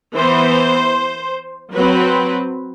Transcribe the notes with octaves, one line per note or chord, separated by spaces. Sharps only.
E3 B3 C5
F#3 C4 B4